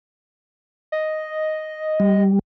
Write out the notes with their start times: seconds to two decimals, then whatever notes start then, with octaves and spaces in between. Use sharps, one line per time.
0.92 D#5
2.00 G3